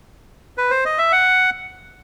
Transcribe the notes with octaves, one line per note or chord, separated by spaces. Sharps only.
B4
C5
D#5
E5
F#5